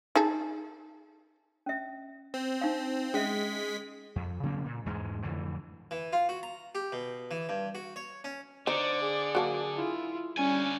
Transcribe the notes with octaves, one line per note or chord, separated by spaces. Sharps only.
D#4 G#4 A4
C#4 E5
C4
D#4 F5
G#3 C#4 E5 B6
F2
C#3 F#3 A#3 C4
A#2
E2 G#2 G#3
F2 A2 D3 E3
E3
F4
F#4
A#5
G4
B2
E3
G2
F#4
C#5
C#4
D3 D#4 C5 D5
G#4
F#3 A#3 A5
E4 F4
D3 G3 C#4 G#5